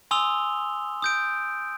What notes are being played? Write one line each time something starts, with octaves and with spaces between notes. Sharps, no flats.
G#5 C6 D#6 E6 F7 G7
D#6 G6 D7